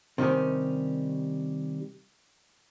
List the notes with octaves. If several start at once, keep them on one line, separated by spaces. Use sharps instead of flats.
C3 D#3 G3 C#4